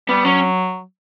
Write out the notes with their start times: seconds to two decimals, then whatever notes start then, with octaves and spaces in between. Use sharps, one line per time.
0.09 G3 B3
0.25 F#3 C#4